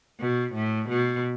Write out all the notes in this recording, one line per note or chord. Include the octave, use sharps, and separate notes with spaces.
B2
A2
B2